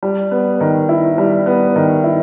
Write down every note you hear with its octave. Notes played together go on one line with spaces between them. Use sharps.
G3
B3
D#3
E4
G3
B3
D#3
E4